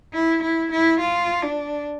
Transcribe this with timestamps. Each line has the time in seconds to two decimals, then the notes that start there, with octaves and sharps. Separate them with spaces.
0.13 E4
0.42 E4
0.71 E4
1.00 F4
1.42 D4